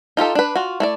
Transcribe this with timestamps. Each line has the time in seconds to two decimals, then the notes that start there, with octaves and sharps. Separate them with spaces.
0.17 D#4 F4 G4 A4
0.35 D4 B4
0.55 F4 F#4
0.80 A3 E4 D5